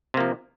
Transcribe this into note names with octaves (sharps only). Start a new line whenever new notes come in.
C3 F3 A#3